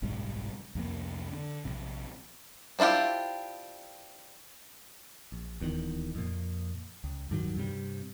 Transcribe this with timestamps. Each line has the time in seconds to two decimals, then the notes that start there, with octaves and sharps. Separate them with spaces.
0.02 F#1 B1 G#2 G3
0.75 C2 F2 C3 A#3
1.31 D3
1.65 A#1 C3
2.79 C4 D4 E4 F4 G4
5.32 A#1
5.60 D#1 E2 G#2 D#3
6.15 F2 A#2
7.04 C#2
7.30 D1 G2 D#3 F#3
7.57 G2 C3 G3